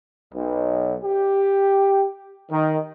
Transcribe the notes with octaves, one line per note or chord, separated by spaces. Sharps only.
B1
G4
D#3